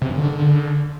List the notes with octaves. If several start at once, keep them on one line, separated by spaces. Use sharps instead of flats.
C3
G2
D3